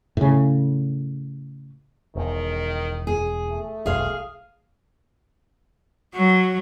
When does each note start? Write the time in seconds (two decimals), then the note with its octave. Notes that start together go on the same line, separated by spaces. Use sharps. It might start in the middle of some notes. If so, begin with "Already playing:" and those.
0.17 A2 C#3
2.16 E1 D#3
3.07 G#4
3.50 A3
3.86 E1 B1 G#4 F5
6.15 F#3